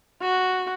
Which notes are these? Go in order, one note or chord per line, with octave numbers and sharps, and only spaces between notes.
F#4